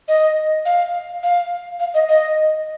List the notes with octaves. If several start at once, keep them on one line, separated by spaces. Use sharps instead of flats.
D#5
F5
F5
F5
D#5
D#5